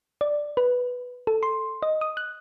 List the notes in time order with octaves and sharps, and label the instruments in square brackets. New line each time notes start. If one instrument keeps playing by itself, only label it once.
[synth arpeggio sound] D5
B4
A4
C6
D#5
D#6
F#6